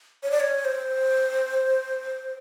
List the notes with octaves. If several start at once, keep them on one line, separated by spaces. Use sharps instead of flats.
C#5
D5
C#5
C5